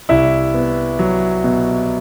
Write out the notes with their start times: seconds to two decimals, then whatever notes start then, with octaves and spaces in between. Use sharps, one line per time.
0.09 C2 E4 E5
0.54 B3
0.99 F#3
1.44 B2